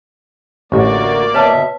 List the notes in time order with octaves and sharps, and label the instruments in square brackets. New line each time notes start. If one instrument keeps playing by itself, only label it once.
[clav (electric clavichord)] A1 [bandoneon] D2 F#4 [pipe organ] A#3 D5
[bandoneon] B2 E5 [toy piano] B4 C#5 A5